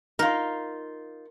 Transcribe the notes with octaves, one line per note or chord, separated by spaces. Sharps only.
D#4 F4 A#4